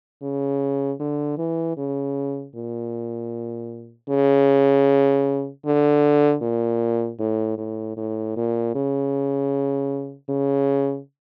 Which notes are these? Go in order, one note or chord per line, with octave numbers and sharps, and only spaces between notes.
C#3
D3
E3
C#3
A#2
C#3
D3
A#2
A2
A2
A2
A#2
C#3
C#3